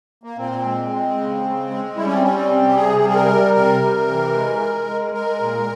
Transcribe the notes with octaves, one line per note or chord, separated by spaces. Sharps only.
A#3
A#2 C4
G#3
G#3
C#3
C#3
G#3
G3 E4
C#4
C4
G3 C#4
C4
C3
G4
C3 G#4
G3
G#4
A#4
G3
C3 A#4
C3
E3
G#3
G#3
G#3
G#3 A#4
A#2